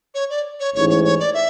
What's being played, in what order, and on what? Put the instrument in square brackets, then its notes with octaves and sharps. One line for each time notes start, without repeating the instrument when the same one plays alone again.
[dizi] C#5
D5
C#5
[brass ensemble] A1 G#2 E3 [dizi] C#5
[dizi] C#5
C#5
D5
E5